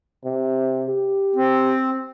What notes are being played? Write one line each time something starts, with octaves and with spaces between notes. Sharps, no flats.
C3
G4
C4